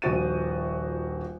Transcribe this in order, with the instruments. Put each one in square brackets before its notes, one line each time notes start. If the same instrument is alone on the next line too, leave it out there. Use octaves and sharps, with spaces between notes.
[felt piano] D#1 A#1 F#4 A6 D#7